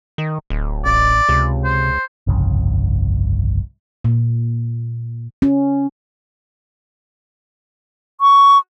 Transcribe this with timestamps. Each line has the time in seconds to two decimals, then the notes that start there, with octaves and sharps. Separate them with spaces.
0.18 D#3
0.50 D1
0.85 A1 D5
1.29 C#2 C3
1.65 C5
2.27 G1 C2 F2 C#3
4.05 A#2
5.42 C#4
8.21 C#6